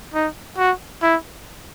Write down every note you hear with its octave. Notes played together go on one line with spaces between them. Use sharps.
D#4
F#4
E4